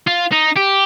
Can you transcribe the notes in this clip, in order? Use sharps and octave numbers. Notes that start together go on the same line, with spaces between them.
F4
D#4
G4